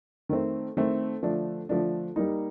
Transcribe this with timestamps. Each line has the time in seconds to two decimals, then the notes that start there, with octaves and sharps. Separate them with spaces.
0.29 D#3 A3 C4
0.77 D#3 A3 C4
1.22 D3 F3 A3 D4
1.69 D3 F3 A3 D4
2.16 G3 A#3 D#4